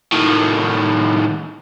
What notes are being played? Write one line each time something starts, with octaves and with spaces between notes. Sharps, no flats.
A2 D#3